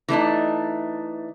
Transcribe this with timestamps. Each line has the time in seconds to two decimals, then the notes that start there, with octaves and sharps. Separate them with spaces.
0.08 E3 A3 D4 D#4